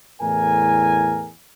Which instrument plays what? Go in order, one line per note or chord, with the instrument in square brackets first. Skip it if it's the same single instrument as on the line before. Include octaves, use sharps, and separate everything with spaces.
[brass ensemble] E2 A2 A#4 G#5